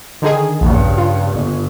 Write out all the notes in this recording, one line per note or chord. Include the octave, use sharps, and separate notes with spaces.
D3 D#3 G#4
A#1 E2 G2 C#3
F4
G1